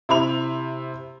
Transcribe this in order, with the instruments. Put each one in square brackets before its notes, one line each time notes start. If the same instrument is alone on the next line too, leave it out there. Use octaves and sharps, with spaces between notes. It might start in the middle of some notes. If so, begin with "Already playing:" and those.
[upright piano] C3 E4 B5 F7